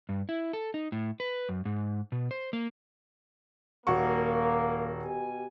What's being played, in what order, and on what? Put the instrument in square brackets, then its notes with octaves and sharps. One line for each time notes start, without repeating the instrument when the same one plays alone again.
[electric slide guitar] G2
E4
A4
D#4
A2
B4
F#2
G#2
B2
C5
A#3
[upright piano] D#1 F#4 C#6 [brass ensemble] A#3
[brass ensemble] B2 G4 G#5